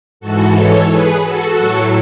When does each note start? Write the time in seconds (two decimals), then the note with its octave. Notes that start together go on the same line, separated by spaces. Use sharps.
0.20 G#2 E3 F#4 A4
0.55 A4 C#5
0.89 G#4 B4
1.23 F#4 A4
1.57 A2 F#3